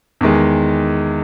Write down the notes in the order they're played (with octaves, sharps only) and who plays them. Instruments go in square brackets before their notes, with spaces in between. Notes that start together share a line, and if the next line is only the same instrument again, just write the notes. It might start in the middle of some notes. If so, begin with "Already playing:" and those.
[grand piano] E2 D#3 G#3